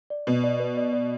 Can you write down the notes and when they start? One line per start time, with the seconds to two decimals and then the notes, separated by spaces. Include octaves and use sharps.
0.10 D5
0.27 B2 B4
0.44 D5
0.60 B4
0.77 D5
0.93 D5